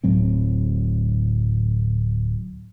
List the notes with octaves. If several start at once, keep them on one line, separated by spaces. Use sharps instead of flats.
D1 A2 F#3 C4